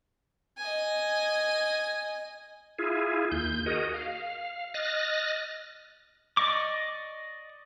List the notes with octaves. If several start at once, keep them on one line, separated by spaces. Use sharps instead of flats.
D#5 G#5
E4 F4 G#4
D#2 G6
F#4 G#4 A#4 D#5
F5
D#5 F6 F#6 A6 A#6
D5 D#5 C#6 D6